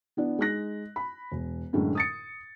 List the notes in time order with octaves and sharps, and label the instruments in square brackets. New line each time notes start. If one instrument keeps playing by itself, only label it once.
[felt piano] E3 B3 D4
G#3 D#4 F#6 A#6
B5
E1
F#2 A2 D3 E3 G#3
D#6 A6 C#7